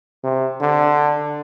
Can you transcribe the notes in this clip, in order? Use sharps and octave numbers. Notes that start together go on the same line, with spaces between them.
C3
D3